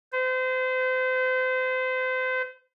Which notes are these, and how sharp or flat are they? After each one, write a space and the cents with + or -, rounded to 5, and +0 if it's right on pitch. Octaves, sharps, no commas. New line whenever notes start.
C5 -30